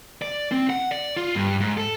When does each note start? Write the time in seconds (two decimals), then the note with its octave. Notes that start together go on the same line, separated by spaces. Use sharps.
0.22 D5
0.52 C4
0.70 F#5
0.91 D5
1.17 F4
1.35 G2
1.60 G#2
1.77 A4